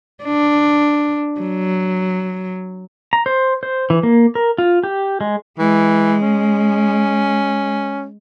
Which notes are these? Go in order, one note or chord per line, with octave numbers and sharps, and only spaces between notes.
D4
F#3
A#5
C5
C5
E3
A#3
A#4
F4
G4
G#3
E3 G#3
C#4